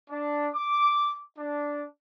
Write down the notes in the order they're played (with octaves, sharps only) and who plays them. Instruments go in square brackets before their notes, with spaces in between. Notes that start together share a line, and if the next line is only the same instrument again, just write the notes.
[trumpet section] D4
D6
D4